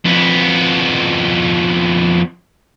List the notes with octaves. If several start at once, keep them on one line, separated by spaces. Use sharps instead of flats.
F2 B3